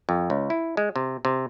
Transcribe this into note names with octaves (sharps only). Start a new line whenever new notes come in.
F2
C#2
E4
G#3
C3
C3